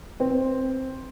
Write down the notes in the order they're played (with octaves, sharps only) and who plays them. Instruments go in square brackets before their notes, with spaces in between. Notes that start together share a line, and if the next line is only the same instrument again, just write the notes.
[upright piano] C4